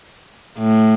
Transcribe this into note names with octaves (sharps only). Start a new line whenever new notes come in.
A2